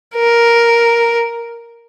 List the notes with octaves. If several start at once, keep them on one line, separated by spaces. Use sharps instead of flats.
A#4